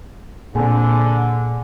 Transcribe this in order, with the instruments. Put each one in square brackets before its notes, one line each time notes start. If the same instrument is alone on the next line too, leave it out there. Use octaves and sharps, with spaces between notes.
[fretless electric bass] A#2 C4 [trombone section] D3 [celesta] G#4 G#5